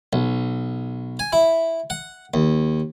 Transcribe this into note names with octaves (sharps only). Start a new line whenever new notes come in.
B1
G#5
E4
F#5
D#2